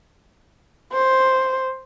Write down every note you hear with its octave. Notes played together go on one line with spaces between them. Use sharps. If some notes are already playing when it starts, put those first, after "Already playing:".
C5